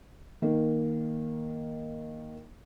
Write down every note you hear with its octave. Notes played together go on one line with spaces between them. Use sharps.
D#3 A#3